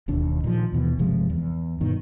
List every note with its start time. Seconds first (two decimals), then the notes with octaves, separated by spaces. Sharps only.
0.08 E1 D#2 D4
0.44 A#2 D#3 F3
0.72 D#2 B2 E3
0.99 G1 C3 F3 G#3
1.30 E2
1.81 G2 B2 D#3